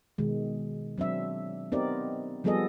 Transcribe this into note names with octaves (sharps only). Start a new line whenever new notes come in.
B2 D#3 G#3
F#3 C4 D4 E5
B3 C4 D#4 G4 A#4 D5
F3 G3 B3 G#4 A4 D#5